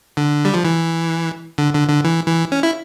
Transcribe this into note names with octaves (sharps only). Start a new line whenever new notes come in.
D3
G3
F3
E3
D3
D3
D3
E3
E3
C#4
E4